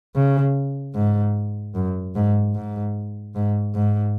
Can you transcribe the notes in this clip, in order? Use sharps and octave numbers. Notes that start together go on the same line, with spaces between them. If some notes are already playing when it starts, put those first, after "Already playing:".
C#3
G#2
F#2
G#2
G#2
G#2
G#2